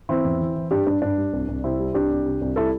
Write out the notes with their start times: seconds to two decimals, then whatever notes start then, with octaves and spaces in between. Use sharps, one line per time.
0.09 E3 C4 E4
0.25 E2
0.41 E3
0.56 E3
0.71 G2 D4 G4
0.86 G2 D4
1.02 G2 D4
1.18 G3
1.33 C2
1.48 C2
1.64 C3 C4 E4
1.80 G3
1.94 C2 D4 G4
2.11 C2
2.26 C3
2.41 C2
2.56 G3 E4 A4